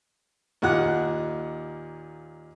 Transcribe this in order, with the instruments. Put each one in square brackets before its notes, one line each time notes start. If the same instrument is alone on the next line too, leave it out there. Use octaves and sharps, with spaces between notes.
[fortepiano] D#2 A#2 F#5 F#6